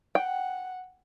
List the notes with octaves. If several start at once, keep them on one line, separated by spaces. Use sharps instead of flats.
F#5 G5